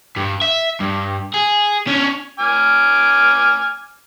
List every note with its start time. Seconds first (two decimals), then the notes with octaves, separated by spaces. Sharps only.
0.17 G2
0.42 E5
0.80 G2
1.34 G#4
1.87 C#4 D4
2.40 G#5 D6 F6